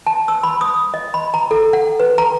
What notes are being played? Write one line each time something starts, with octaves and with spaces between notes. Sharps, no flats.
A5
E6
B5
D#6
D#5
B5
A#5
A4
F#5
B4
A#5